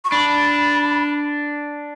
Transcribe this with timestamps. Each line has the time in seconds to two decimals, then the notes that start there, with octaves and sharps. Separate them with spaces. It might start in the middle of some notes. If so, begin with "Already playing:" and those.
0.05 C#6
0.11 D4 B5